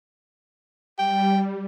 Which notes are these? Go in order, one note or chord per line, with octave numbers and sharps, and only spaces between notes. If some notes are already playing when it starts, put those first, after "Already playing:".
G3 G5